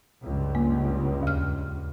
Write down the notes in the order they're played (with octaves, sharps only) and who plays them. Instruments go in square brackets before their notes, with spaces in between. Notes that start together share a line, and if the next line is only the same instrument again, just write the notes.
[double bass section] C#2 G2
[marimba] A#3
D#2 F6